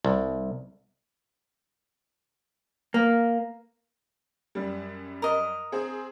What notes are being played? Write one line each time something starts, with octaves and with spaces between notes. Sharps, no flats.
C2
A#3
F#2 G3
A#4 D#5
C4 G#4